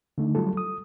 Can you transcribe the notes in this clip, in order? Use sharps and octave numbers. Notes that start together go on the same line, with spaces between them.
D3 A3 D#4
F#3 G3 F4 A4
D#6